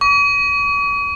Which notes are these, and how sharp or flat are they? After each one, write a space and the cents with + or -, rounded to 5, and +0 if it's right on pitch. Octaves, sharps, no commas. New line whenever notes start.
C#6 +45